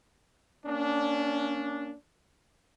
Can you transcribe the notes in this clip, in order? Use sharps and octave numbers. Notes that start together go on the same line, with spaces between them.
A#3 C#4 D4